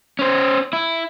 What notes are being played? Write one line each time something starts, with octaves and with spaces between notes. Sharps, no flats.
C#4 C5
E4